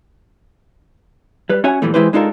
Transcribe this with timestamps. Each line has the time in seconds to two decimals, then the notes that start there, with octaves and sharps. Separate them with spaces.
1.49 G3 B4
1.64 C#4 F#4 C#5 E5 F#5 G#5
1.82 A#2 E3 F3 G3 A3
1.94 E3 G#3 E4 G4 B4 C5
2.13 G#3 D4 D#4 F4 A4 A#4